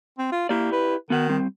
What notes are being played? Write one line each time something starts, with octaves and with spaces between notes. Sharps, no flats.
C4
F4
A#3 E4 G4 D5
B4
D#3 B3 F#4 F#5
G3 C4